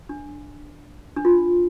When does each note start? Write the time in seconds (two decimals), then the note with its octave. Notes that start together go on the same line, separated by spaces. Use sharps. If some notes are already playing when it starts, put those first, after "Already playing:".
0.09 D4
1.16 D4
1.25 F4